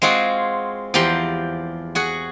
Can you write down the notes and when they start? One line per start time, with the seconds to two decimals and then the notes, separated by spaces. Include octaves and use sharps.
0.02 G#3 C4 F4 F#4 G#4
0.94 E2 F3 G4 A#5 C6
1.95 F#4 G#4 F#5